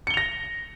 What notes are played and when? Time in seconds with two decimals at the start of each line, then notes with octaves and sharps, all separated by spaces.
0.07 C#7
0.10 G7
0.14 F7
0.17 A#6